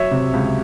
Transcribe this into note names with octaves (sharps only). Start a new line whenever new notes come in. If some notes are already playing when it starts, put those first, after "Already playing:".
Already playing: F#3 C#5 E5
C3
C#2